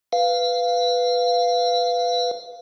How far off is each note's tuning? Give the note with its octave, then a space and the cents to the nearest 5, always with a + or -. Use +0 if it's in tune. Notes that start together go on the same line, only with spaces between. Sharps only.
B4 +0 F5 -5